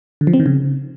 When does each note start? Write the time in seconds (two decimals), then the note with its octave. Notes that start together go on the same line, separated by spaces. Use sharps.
0.21 D3
0.27 F3
0.33 C4
0.40 D#3
0.46 C#3